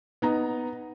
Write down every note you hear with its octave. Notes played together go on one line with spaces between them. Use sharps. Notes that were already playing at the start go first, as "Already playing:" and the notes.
B3 D#4 A#5